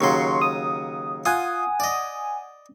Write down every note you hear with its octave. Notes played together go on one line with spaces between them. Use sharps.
D#2 C#3 F#3 C6 C#6
D#6
F4 F#5 G#5 D#6
D5 D#5